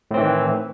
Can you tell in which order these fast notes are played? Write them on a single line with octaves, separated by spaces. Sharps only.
A2 C4 E3 D#3